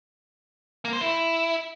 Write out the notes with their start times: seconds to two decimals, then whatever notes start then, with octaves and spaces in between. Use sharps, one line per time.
0.85 A#3
0.93 C5
1.01 E4